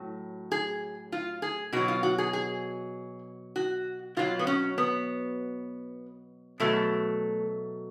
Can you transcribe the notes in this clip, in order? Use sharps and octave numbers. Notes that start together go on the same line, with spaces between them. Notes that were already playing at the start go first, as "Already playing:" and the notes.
Already playing: A2 F#3
G#4
F4
G#4
B2 F#3 F#4
F4
F#4
G#4
G#4
F#4
B2 F#3 F4
B3
C#4
B3
B2 F#3 A3